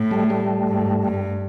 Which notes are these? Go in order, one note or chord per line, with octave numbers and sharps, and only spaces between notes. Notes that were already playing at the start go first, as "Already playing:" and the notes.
Already playing: A2
G3 A3
G3 A3
G#2
G2